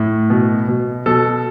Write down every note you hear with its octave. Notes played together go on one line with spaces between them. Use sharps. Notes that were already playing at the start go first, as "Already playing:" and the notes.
Already playing: A2
B2
B2
B2 A4